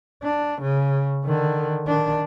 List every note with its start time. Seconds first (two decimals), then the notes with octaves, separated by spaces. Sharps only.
0.23 D4
0.62 C#3
1.24 D3 D#3
1.86 D#3 D4